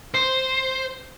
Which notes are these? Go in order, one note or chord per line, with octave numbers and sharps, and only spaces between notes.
C5